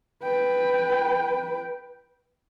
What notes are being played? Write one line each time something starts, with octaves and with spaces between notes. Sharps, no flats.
B4 G5